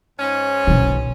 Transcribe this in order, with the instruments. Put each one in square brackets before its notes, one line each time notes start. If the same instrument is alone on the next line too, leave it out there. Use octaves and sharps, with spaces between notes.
[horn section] G#2 C#4
[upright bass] B1 C#3